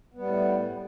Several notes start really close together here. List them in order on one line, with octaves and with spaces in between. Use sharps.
B3 G3 A2